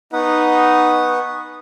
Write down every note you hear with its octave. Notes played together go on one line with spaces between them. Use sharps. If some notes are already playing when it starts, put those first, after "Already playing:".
B3 D#4 B4 F#5 G#5 C#6 D#6